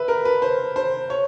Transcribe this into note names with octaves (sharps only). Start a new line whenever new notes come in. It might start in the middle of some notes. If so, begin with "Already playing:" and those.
Already playing: B4 E5
A#4
B4
C5
C5
C#5